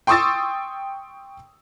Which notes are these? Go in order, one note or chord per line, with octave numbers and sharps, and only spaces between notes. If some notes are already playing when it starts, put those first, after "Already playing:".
G5 C6 C#6 D#6 E6 A6